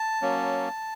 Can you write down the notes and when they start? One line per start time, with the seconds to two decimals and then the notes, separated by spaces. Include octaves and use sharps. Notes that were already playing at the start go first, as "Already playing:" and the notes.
Already playing: A5
0.22 F#3 A#3 C#4